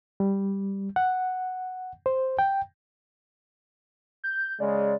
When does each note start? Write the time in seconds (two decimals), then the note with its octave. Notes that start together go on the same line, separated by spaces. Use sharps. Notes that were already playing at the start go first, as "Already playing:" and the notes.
0.20 G3
0.96 F#5
2.06 C5
2.39 G5
4.24 G6
4.60 C#3 G#3 D5